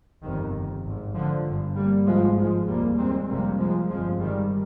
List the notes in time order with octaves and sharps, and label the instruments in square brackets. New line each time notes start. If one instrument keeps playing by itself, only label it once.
[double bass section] G1 F2 C3 D#3
G#1 G#2
D3 F3
G1 G2
G3 A#3
G#1 G#2 F3 G#3
F3 G#3
F1 D#2 G3 A#3
G#3 C4
F1 F2 C3 G3 A#3
F3 G#3
G1 F2 C3 F3 G#3
D#3 G3